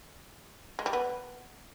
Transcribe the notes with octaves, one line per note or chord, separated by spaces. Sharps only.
G#3
G3
B3